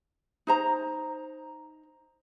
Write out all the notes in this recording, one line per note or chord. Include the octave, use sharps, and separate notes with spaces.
D#4 C5 A#5